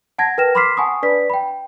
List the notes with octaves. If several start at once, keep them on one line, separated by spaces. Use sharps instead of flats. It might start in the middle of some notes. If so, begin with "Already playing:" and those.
F#5 A5 G#6 A#6
A#4 B4 G5 F6 A#6 E7
B5 C6 D6 F6 B6 C7
F#5 G#5 A5 B5 C#6 D#6
D4 B4 D5 B6
G5 B5